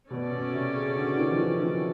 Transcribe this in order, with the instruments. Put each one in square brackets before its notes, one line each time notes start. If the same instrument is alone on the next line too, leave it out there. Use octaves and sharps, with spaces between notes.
[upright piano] B2 [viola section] C#4 F#4 A4 D5
[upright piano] B2
C3
C#3
D3
D#3
F3
E3
D#3